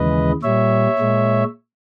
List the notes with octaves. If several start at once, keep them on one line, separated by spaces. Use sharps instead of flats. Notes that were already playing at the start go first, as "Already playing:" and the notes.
Already playing: D#2 C#3 E3 G#3 B4 D#5
A#2 G3 C#5 E5
A#2 G#3